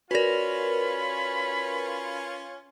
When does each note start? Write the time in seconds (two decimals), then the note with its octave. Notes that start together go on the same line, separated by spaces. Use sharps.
0.11 C#4 F4 F#4 A#4 B4 D5 B5